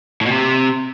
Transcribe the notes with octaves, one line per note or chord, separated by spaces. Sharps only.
A2
B2
C3